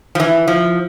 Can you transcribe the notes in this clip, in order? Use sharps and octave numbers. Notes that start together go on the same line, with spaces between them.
F3
E3
F3